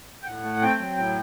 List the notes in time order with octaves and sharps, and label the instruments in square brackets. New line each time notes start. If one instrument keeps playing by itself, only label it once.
[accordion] G5
A2 F#5
A3
C4 G5
F#3
A2